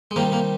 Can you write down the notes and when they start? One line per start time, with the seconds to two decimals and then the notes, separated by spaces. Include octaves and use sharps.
0.11 G#3
0.16 C3 D#3 G3 A#3
0.32 A#3